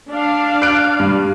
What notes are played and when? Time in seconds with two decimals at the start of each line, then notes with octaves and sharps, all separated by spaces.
0.10 D4 D5 F5
0.62 F#6 D7
1.00 G2